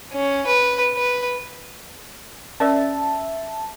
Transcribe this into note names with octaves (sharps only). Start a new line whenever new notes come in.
C#4
B4
B4
C#4 A#4 D5 E5 A5